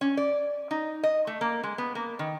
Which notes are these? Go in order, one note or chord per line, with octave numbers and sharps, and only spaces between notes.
C#4
D5
D#4
D#5
A3
A#3
G#3
B3
A#3
D#3